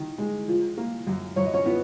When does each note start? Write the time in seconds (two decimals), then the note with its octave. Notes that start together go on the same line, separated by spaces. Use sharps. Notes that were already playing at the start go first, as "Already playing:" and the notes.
Already playing: D#3
0.18 G#3
0.48 F3
0.77 A#3
1.07 F#2
1.36 F#2 C#5
1.45 D#5
1.54 C#4 C#5
1.66 F3 B3 B4